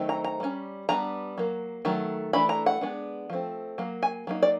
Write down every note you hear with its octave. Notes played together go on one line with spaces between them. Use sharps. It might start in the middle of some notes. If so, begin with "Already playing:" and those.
Already playing: D#3 F#3 A3 C4 D#4
A#5
A#5
G3 A#3 C#4
G3 B3 D4 A#5
F#3 A#3
D#3 F#3 A3
E3 A3 D4 B5
A#5
F#5
G#3 B3 D4
F3 A3 C4
F#3 A#3
G#5
F#3 A#3 D#4
D5